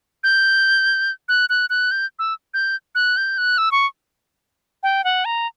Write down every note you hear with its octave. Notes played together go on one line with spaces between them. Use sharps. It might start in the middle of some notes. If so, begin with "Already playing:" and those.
G6
F#6
F#6
F#6
G6
E6
G6
F#6
G6
F#6
E6
C#6
G5
F#5
A#5